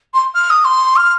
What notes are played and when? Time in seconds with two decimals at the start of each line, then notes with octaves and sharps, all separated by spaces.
0.14 C6
0.34 F6
0.50 D#6
0.64 C6
0.96 F6